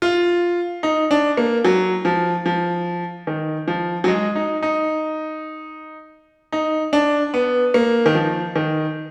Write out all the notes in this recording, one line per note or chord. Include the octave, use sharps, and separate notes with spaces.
F4
D#4
D4
A#3
F#3
F3
F3
D#3
F3
F#3
G#3
D#4
D#4
D#4
D4
B3
A#3
D#3
F3
D#3